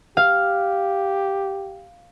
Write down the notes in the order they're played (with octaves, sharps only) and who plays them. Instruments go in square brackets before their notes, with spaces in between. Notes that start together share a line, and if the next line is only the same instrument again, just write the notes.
[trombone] G4 [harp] F5